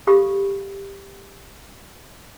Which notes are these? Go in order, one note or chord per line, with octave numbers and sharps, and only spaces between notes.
G4 A4 F5 B5 C#6 D#6